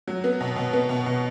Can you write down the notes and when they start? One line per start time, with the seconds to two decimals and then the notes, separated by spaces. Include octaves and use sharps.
0.08 F#3
0.24 B3
0.41 B2
0.56 B2
0.73 B3
0.89 B2
1.06 B2